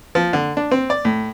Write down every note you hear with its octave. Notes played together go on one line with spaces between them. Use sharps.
F3
D3
D4
C4
D5
A2